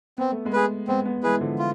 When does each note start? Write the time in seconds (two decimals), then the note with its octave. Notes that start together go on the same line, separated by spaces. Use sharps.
0.18 B3 C4
0.32 A3
0.45 G#3 B3
0.53 G#4 B4
0.88 G#3 B3 C4
1.05 G#3 B3
1.23 E3 G#3 G#4 B4
1.40 D3 F3
1.59 F4